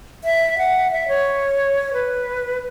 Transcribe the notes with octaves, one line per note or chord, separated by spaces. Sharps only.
E5
F#5
E5
C#5
B4